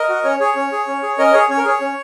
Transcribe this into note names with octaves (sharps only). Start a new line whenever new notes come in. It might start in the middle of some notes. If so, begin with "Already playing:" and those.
Already playing: A#4 D#5
F#4
C#4 C#5
G#4 C#5
C#4
G#4
C#4
G#4
C#4 A#4 D#5
G#4 C#5
C#4 C#5
A#4
G#4 C#5
C#4